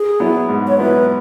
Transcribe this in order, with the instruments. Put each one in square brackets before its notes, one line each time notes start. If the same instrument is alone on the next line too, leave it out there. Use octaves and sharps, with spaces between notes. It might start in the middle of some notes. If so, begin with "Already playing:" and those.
Already playing: [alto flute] G#4
[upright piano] F#3 B3 E4
G#2
[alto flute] C#5
[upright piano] F#3 B3 E4 [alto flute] B4